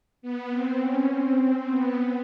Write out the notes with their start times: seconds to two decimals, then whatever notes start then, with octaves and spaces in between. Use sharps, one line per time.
0.22 B3
0.51 C4
0.80 C#4
1.09 C4
1.38 C4
1.67 B3